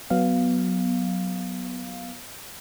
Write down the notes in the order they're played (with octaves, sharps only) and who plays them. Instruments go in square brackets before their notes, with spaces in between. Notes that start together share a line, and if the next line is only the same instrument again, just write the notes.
[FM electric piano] F#3 B3 F5